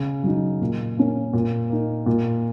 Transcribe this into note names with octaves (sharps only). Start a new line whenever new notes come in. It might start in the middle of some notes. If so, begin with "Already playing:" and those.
Already playing: C#3
F#3 D#4
A#2
A#3 C#4
A#2
A#3 D#4
A#2